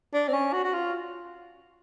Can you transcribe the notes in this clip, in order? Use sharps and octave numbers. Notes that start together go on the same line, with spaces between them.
D4
C4
C#4
F#4
F#4
F4